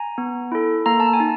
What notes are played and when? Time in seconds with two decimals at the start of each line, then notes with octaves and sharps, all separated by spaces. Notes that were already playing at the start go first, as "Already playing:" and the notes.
Already playing: G#5 A#5
0.18 B3
0.52 E4 A4
0.86 A#3 A#5
1.00 A5
1.13 G#5
1.20 D#4